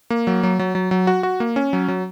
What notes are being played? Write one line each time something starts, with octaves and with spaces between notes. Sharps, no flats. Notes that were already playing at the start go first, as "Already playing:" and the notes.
A#3
F#3
F#3
F#3
F#3
F#3
F#4
F#4
A#3
C#4
F#3
F#3